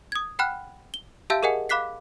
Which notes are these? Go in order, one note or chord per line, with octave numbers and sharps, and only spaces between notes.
D#6 G#6
F#5 G5 B5 F6 F#6
G7
G4 E5 F5 A5 E6 G6
G#4 A#4 D#5 F#5 G#5
F5 B5 D6 F#6 B6 C7